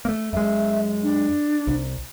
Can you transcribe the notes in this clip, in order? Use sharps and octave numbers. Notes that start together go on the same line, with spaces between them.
A3 A#3
F#2 G#3 E5
D4
C2